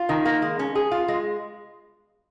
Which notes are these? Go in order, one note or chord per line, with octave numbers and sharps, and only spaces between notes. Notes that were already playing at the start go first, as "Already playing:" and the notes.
Already playing: F4
D#3
A#3
G#3
C#4
G#4
F4
G#3